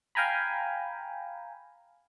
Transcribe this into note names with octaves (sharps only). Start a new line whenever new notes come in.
F5 G5 G#5 A#5 B5